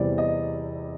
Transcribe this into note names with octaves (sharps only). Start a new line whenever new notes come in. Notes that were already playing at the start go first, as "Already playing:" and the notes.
Already playing: E2 C3 E3 G3 C4 D5
D#5